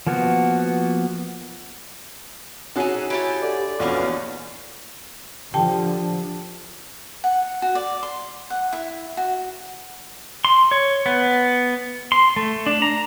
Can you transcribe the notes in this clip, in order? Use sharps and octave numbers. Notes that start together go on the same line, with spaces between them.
F3 A#3 B3 F#4
C#4 D#4 F#4 G#4 A4
E4 G4 C#5 G#5 A5
D3 D5
A#1 E2 E3 C#4 F#4 C#5 D#5 F5
D3 F3 G4 G5 A5
F#5
F#4
D5
C6
F#5
E4
F#4
C6
C#5
B3
C6
A3
D4
A#5